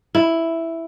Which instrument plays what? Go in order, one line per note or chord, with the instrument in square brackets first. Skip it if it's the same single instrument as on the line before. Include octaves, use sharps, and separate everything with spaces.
[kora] E4